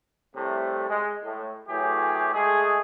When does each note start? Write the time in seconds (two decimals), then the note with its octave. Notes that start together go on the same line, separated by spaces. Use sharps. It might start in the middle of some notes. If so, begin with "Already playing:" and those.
0.35 C2 A2 C3 A3
0.88 G#3
1.24 A2
1.68 A2 E3 F#3 G4 G#4
2.33 G#3 A3 G#4